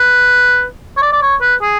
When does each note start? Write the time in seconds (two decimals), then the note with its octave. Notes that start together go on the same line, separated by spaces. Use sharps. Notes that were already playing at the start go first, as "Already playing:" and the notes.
Already playing: B4
0.97 C#5
1.02 D5
1.13 D5
1.22 C#5
1.41 B4
1.62 G#4